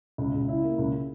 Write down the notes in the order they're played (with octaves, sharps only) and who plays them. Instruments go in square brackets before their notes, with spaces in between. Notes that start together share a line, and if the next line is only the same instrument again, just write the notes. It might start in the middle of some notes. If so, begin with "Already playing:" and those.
[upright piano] C#2
C#2
E4
A#3
C#2